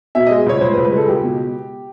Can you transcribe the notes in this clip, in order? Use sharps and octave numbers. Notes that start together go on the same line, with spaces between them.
B2 E5
G#3 D#5
C#2 C#5
C#2 C5
B4
C#2
B4
G#3 A4
C#2 G4
B2